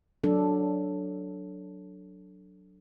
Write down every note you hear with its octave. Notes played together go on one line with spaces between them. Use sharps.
F#3 D4 A4